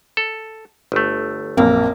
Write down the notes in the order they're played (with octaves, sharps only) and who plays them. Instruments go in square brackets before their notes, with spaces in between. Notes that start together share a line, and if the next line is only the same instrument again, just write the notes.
[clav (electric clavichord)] A4
G1 A3
[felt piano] A#1 F#2 [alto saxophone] A#3 [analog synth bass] C4